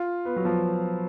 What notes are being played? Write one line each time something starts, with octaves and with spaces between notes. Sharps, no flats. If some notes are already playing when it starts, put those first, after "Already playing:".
Already playing: F4
B3
F#3
F3